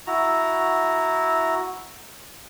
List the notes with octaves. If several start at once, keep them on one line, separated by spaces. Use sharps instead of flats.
E4 F#4 A#5